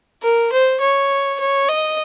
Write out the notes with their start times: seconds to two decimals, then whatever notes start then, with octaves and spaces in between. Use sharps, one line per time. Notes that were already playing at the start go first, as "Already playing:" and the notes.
0.23 A#4
0.52 C5
0.81 C#5
1.40 C#5
1.69 D#5